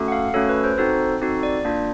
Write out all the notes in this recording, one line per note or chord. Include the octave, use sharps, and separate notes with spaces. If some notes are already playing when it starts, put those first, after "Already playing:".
Already playing: A3 C#4 F#4 A4
F#5
F5
A3 C#4 F#4 A4 C#5
B4
C5
C4 D#4 F#4 A4 C5
C4 D#4 F#4 A4
D5
A#3 D4 F4